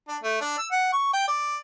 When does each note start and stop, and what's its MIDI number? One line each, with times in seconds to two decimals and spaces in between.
0.08 0.17 62
0.23 0.39 57
0.41 0.54 62
0.58 0.66 88
0.71 0.89 78
0.93 1.11 85
1.13 1.27 79
1.28 1.56 74